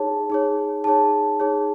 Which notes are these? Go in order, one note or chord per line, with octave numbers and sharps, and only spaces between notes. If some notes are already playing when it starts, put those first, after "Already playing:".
Already playing: D#4 G#4 C#5 A5
D#4 G#4 C#5
D#4 G#4 C#5 A5
D#4 G#4 C#5